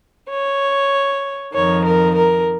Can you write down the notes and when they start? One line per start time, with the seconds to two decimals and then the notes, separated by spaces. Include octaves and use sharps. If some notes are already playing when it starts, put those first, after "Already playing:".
0.28 C#5
1.53 F2 D#3 C#5
1.85 A#4
2.15 A#4